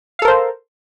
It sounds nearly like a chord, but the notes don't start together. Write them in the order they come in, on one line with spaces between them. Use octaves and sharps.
F5 A4 A#4 C5